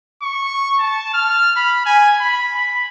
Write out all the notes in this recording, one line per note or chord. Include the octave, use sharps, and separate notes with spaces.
C#6
A5
F6
B5
G#5
B5
B5